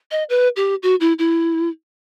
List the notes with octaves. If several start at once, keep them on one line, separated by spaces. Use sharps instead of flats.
D#5
B4
G4
F#4
E4
E4